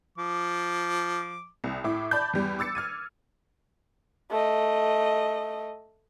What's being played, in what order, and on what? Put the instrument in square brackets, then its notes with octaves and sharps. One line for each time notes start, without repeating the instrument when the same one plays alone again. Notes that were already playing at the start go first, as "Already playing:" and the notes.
[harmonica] F3 D6
[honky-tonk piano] C2
A2 E4 D6
D5 A5 B5 G6
E2 G3
D6 E6 A6 C#7
F6 G#6 D#7
[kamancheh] A3 D#5